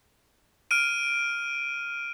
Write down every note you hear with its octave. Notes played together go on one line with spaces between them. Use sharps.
F6 D7 D#7